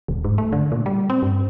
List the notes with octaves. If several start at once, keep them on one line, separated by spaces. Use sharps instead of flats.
D#1
G#2
A3
D3
A#2
G3
C4
G2